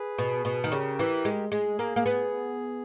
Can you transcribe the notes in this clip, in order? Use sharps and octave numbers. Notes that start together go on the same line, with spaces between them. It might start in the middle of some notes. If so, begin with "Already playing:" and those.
Already playing: G#4 B4
B2
B2
D#3
C#3 G4 A#4
E3
G#3
G#3 G#4
A#3
A#3
B3